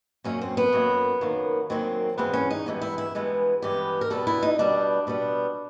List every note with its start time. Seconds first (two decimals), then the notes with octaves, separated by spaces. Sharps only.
0.24 F#2 D#3 F#3 A#3 C#4
0.41 C4
0.57 B3
0.73 F#2 D#3 F#3 A#3
1.21 F#2 D#3 F#3 A#3
1.70 F#2 D#3 F#3 A#3 C4
2.18 G2 E3 G#3 B3 C4
2.33 C#4
2.50 D#4
2.66 G2 E3 G#3 B3
2.82 E4
2.98 E4
3.15 G2 E3 G#3 B3
3.62 G2 E3 G#3 B3 G4
4.01 A#4
4.10 B2 G3 B3 A4
4.27 E4
4.43 D#4
4.59 B2 G3 B3 D4
5.07 B2 G3 B3